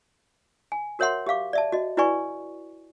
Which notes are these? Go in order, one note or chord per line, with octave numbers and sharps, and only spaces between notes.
G#5
F#4 A#4 C#5 E5 F#5 C6
G4 E5 F5 D6
D5 E5 A5
F#4 D#5
E4 F#4 B4 D5 G#5 C#6